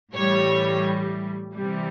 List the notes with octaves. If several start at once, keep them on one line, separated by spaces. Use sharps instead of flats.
A2 E3 G3 C#5
C3 E3 G3